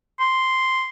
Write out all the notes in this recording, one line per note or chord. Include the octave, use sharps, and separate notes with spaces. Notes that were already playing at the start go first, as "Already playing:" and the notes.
C6